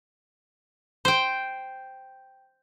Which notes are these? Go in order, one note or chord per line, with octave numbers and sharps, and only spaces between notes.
C5 G5